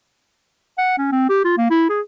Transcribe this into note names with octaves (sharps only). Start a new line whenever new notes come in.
F#5
C#4
C4
G4
F4
A#3
E4
G#4